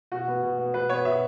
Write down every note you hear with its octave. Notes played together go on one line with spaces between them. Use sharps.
B2 F#4
B3
B2
B3
B2 B4
B3 C#5
B2 E5